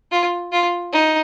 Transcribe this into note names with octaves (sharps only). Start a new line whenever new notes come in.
F4
F4
D#4